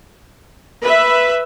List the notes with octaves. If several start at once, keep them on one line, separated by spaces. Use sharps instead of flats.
B4 E5